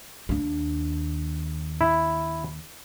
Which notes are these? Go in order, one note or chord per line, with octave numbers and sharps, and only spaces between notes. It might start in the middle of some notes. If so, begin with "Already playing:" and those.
D#2 D4
E4